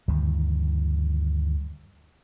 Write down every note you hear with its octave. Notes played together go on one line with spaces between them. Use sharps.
D2 G2 D#3 E3